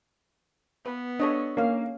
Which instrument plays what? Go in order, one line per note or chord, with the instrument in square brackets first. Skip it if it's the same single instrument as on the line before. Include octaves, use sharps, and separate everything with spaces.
[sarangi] B3 [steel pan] B4
[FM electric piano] D4 [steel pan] A4 C#5 D#5
[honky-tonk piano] A#3 [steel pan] C#4 F5